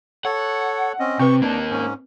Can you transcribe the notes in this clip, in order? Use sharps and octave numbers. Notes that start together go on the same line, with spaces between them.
A4 C#5 F#5
C4 C#4 D#5
C3 C4 B4 C#6
A#3 D4 D#4
G#2 C#4